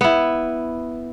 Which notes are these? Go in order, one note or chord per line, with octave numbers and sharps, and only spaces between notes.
B3 E4